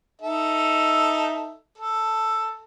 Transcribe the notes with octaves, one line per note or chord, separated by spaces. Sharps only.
D#4 A4 E5
A4